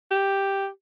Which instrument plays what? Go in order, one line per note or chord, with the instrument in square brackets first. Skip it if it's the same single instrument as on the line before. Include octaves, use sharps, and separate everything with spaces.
[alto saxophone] G4